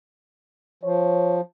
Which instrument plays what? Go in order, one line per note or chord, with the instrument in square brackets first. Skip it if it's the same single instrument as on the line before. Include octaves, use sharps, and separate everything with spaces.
[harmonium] F3 [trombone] C#5